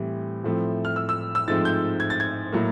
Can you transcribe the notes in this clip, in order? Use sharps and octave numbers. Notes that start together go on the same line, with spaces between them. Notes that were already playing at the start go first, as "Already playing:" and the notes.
Already playing: A2 E3 G3 C4
A2 F3 A3 C4
F6
E6
E6
E6
G#2 F3 A3 C4 A6
G6
G#6
A6
G#6
A2 F#3 A#3